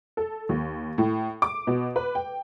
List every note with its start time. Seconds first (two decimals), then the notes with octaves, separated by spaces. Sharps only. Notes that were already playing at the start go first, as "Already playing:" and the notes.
0.17 A4
0.49 D#2
0.98 A2
1.42 D6
1.67 B2
1.96 B4
2.15 G5